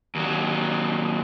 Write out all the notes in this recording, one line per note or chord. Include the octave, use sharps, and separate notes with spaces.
D#2 F#3